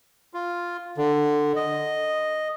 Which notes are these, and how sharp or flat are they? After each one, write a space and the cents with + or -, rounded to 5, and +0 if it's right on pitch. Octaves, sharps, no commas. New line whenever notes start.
F4 +0
D3 +15
D#5 -5